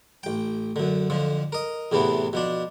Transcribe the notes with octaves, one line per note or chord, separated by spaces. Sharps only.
A1 G5
F#2 D3
F2 D3 F3
A#4 D#5
E2 A2 C3 E3 B3
B2 F3 D4